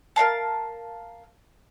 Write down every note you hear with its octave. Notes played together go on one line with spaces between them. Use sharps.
A#4 D#5 F5 A5